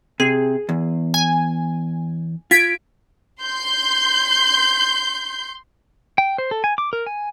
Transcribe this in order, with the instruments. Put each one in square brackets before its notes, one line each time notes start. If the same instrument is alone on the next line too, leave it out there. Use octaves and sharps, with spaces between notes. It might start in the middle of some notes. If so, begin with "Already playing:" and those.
[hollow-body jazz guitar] C3 [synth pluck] G#4
[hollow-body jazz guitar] E2
[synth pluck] G#5
[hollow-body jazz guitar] F4 [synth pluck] G#6 B6 D7
[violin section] C6 G6
[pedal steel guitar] G5
C5
A4
G#5
D6
A#4
G#5